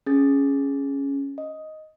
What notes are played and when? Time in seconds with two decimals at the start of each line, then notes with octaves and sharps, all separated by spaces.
0.06 C#4 G#4 A6
1.38 D#5